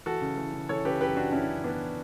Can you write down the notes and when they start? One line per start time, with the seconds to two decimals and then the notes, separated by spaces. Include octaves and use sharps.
0.06 E3 F#4 A4
0.22 C#3
0.37 E3
0.54 C#3
0.69 E3 A4 C#5
0.85 C#3 G4 B4
1.01 F#2 G4 B4
1.17 E3 D4 F#4
1.32 F#2 C#4 E4
1.48 F#2
1.64 E3 B3 D4